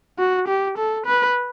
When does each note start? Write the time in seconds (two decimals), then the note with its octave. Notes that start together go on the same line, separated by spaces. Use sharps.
0.19 F#4
0.48 G4
0.78 A4
1.06 B4